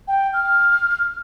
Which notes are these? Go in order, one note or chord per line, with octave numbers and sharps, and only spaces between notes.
G5
F6